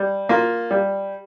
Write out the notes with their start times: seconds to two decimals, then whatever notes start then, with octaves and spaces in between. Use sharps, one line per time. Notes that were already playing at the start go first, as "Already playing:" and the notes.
Already playing: G3
0.29 A#3 F4
0.71 G3